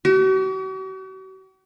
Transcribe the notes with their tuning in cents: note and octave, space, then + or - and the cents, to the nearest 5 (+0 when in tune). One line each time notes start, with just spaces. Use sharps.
F#4 +45